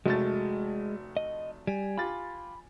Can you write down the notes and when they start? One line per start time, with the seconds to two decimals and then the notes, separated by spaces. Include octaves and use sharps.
0.06 F1 G#3 A3 F#4 A6
1.17 D#5
1.67 G3 G#5
1.98 F4 G4 B5 A6